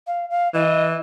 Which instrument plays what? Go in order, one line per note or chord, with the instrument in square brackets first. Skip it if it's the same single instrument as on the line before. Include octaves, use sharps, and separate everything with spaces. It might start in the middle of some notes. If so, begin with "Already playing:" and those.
[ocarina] F5
F5
[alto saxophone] E3 [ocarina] D#5